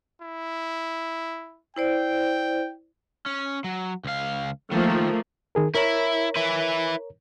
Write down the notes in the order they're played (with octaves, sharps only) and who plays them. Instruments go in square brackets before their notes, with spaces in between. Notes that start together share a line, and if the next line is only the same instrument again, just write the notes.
[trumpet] E4
[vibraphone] E4 C5 D5 [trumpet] G5
[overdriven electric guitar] C#4
F#3
C#2 F5
[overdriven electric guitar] D#3 [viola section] F3 A3 A#3
[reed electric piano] D#3 G#4 A#4
[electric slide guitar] E4 [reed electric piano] A#4 C#5 A#5
[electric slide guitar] E4 B4